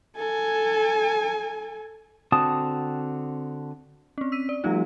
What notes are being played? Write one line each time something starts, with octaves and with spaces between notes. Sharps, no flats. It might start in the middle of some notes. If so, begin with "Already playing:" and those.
A4 G#5
D3 C4 F#4 A5 D#6
C4 C#4
E6 B6 D#7
D5
F3 G3 A3 D#4 F4